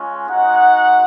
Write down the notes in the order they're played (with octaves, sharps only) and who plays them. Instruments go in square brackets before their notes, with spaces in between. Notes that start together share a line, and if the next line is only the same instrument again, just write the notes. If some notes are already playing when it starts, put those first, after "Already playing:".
Already playing: [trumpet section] G#3 C#4 F4
G#3 D#4 F#4 F#5